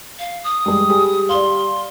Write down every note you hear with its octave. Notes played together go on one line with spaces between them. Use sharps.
F5
D#6
G3 G#3
G3 G#4
D5 F5 C6